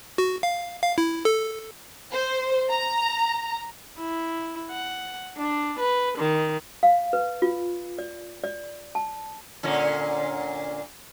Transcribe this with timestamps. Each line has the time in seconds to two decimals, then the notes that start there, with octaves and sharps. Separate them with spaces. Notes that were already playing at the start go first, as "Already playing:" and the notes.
0.18 F#4
0.43 F5
0.82 F5
0.98 E4
1.25 A4
2.13 C5
2.71 A#5
3.98 E4
4.71 F#5
5.38 D4
5.79 B4
6.18 D#3
6.83 F5
7.13 B4
7.42 F4
7.98 D5
8.44 D5
8.95 A5
9.63 A#2 D3 C#4